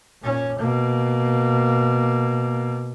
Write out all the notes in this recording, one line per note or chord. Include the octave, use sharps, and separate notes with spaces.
A#2 C#4
B2 A#3